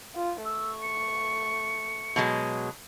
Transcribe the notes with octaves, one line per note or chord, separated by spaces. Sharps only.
F4
A3 C#6 E6
C#7
B2 F#3 G#3